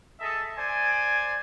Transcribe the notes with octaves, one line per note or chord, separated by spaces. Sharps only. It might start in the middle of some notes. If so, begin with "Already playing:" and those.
G#4 A4 D#5 E5 A5
C5 D5 G#5